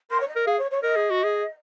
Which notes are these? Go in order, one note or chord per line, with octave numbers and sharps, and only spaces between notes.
A#4 C6
C#5
D#5
A#4
G#4 F5
C#5
C#5
A#4 D#5
G#4
F#4
G#4